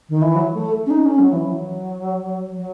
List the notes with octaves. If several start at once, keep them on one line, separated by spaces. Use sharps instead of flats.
D#3
E3
F#3
A3
C#4
D#4
C#4
F#3
E3
F#3
F#3